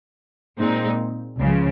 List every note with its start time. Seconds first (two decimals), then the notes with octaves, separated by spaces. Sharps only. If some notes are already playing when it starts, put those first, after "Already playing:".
0.58 A#2 G#3 C4 D#4
1.39 C#2 C#3 F3